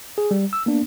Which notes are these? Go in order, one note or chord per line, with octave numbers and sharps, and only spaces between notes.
G#4
G3
E6
A#3 B3 D4